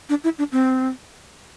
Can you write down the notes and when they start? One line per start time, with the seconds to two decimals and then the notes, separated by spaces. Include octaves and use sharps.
0.09 D4
0.24 E4
0.38 D4
0.52 C4